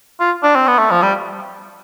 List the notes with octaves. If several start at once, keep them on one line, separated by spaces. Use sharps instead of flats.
F4
D4
C4
B3
A3
F3
G3